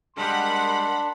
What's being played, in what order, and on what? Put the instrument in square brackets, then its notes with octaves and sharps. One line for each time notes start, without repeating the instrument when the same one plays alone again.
[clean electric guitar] G3 G#3 G4 [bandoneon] D4 [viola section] A#4 F#5 B5 [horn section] C6